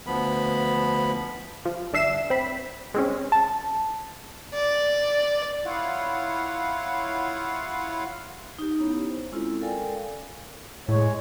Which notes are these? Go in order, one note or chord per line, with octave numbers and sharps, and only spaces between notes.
D2 F3 B3 B5
F3
G1 D4 E5 C7 E7
C4 B5
G#3 C4 C#4
A5
D5
E4 F4 C#5 F5 F#5
D#4 G4
B3 C#4 E4 C#5 A#5
C5
G#3 C4 C#4 E4 F4 A4
A4 A#4 D5 F5 G5 G#5
A2 G#3 C#5